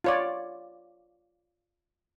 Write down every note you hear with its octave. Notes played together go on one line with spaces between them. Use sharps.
F4 C#5 D5